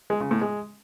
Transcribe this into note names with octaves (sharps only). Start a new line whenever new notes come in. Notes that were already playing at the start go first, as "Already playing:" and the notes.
G#3
C#3
A2
G#3